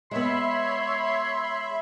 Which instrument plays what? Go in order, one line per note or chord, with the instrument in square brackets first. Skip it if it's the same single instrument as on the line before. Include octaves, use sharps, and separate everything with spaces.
[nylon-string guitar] G#3 B3 [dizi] C#5 [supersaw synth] E5 B5 [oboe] C6